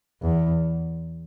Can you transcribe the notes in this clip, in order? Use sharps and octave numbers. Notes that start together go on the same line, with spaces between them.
E2